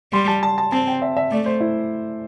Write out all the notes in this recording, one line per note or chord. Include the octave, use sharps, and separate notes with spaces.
G3 C6
A5
A5
A5
C4 A5
G5
E5
E5
A3 D5
C5
E4